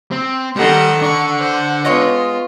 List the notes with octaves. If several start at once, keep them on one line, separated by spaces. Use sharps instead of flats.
C4
D#3 G3 C4 D#4 A4 F#5
D4 A4 F#5 C#6
C5
G#3 B3 F4 C#5 D#5